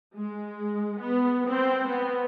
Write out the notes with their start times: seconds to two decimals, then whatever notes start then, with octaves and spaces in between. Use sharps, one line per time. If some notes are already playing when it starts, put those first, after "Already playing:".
0.16 G#3
1.00 B3
1.47 C4
1.89 B3